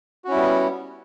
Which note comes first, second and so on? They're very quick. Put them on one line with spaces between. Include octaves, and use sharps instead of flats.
F#4 C#4 E4 G3 B3